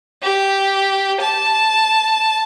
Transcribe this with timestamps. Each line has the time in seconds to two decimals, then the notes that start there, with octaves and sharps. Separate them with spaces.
0.22 G4
1.20 A5